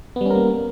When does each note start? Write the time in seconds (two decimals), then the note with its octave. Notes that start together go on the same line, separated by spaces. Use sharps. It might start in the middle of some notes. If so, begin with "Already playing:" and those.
0.16 B3
0.21 G3
0.26 C#4
0.30 A#4
0.35 A#3